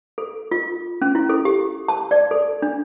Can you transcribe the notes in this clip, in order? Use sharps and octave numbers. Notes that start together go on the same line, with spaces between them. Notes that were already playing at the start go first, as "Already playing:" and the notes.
A4
F4
C#4
E4
A4
G4
A5
D5
A4
D4